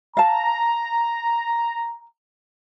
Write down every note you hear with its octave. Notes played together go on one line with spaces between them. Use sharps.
F5 A5 A#5